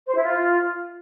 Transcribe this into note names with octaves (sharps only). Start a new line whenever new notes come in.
C5
E4
F4